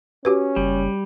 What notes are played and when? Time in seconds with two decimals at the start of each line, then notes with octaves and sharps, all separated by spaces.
0.25 C#4 F#4 G4 B4
0.56 F#1 G3